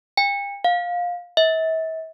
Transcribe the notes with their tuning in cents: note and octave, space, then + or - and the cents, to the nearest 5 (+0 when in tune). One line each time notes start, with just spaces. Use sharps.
G5 +40
F5 +15
E5 -40